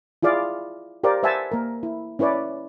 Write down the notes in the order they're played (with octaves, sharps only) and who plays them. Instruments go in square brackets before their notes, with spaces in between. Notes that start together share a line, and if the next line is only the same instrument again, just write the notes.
[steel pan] E4 F4 G#4 D5 F5
G4 A#4 C5 D5 F5
B4 C5 E5 F#5 G#5 A5
A#3 A#4
E4
C#4 E4 B4 C#5 D5